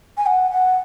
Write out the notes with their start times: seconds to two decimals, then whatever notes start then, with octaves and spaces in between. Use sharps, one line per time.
0.18 G#5
0.26 F#5
0.51 F#5